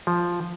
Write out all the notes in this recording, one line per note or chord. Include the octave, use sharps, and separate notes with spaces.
F3